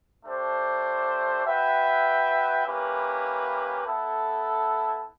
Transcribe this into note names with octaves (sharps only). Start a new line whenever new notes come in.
A3 D4 G4 C5
F#4 B4 E5 G5
A#3 C#4 E4 G4 B4
B3 E4 A4